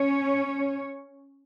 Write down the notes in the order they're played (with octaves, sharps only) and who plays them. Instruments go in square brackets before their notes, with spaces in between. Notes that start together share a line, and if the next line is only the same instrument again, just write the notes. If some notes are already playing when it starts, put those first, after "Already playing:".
Already playing: [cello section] C#4 C#5